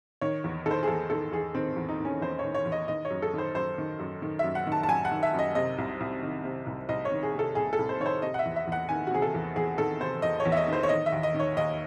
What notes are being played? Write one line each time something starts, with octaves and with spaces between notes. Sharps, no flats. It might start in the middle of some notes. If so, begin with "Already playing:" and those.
D#3 C#5
E2
D#3 A4
C5
G#4
E2 A4
D#3 A4
E2 G#4
D#3 C4
E2
D#4
D#3 C#4
E2 C5
C#5
D#3
C#5
E2
D#5
D#3 D#5
C#5
F#2
A4
D#3 C5
F#2 C5
D#3
F#2
D#3
F#2 E5
F#5
D#3
A5
A5
F#2 G#5
F#5
D#3
E5
F#2
D#5
C3 D#5
C2
C2
D#3
C3
C2
C2 D#5
C#5
D#3
G#4
C3 A4
C2 G#4
A4
C2
C5
D#3 C#5
C5
C3 D#5
F#5
E5
E2
E5
E2 F#5
D#3 G#5
F#4
C3 G#4
A4
E2
E2 G#4
D#3 A4
C3 C5
E2 D#5
C#5
E2
E5
D#5
D#3 C5
C#5
D#3 D#5
E5
D#2
D#5
D#3
C#5
D#2 D#5